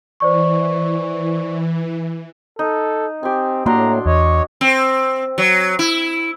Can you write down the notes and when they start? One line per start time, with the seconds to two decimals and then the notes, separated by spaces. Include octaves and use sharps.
0.20 E3 C5 D5 C#6
2.59 D#4 A4
3.23 C4 G4 G#5
3.66 A2 F#3 A#3 D4 A#5 C6
4.06 E2 C#5 D#5
4.61 C4
5.38 F#3
5.79 E4